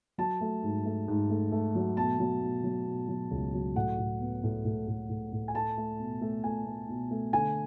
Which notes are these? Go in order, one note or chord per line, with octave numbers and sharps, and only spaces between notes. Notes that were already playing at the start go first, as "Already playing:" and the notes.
F#3 A5
A3
G#2
A3
G#2
A3
A3
F#3
B2 A5
F#3
B2
F#3
B2
F#3
C#2
F#3
A2 F#5
A2
B3
A2
A2
A2
A2
A2
G#5
A3 A5
A3
B2
A3
A3 G#5
A3
B2
A3
D3 G#5